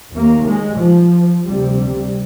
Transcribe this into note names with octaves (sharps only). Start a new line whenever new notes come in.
D#2 A#3
G#3
F3
D2 C3 G3
G3